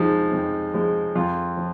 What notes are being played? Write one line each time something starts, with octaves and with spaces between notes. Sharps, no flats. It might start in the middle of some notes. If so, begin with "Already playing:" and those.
Already playing: F2 F3 G#3 D#4
F2
F3 G#3
F2 F4
F3